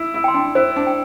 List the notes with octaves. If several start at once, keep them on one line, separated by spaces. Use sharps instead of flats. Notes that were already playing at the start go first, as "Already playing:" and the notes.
Already playing: E4
E4
G5 C6
D4
E4 C5
D4
G5